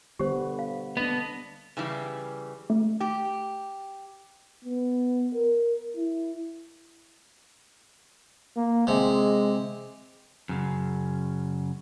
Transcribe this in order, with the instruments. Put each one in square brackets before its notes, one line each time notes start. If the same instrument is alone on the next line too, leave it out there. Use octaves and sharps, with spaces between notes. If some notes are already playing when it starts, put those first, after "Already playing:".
[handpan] D3 G3 B3 [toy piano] G4 C5
[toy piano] F5
[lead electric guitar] B3 [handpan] D4 D#5
[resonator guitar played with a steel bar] C#3 E3 G3
[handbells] A3
[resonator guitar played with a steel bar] G4
[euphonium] B3
A#4
E4
[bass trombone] A#3
[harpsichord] C3 [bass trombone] G#3
[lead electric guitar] F#2 C#3